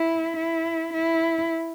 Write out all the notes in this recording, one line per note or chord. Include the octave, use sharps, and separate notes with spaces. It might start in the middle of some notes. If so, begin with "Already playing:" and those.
Already playing: E4
E4
E4